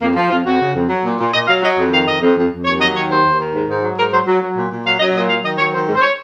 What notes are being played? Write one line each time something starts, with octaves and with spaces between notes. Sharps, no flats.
F2 A#3
F3
F2 F4
F2 F#4
C#3
F2
F#3
A#2
A#2
A#2 D#5
F#3 F5
F#3 D#5
F2
D#3 F5
F2 D#5
F2
F2
F2
D#2 C#5
F#3 D#5
D#3 C#5
D#2 C5
D#2
D#3
G#2
G#2
F#3
G#2 A#4
F#3 C5
F#3
F#3
A#2
A#2
F#3 F5
F#3 D#5
A#2 D#5
F#3 F5
D#3 D#5
F#3 C#5
D#3 C5
G#2
C5
C#5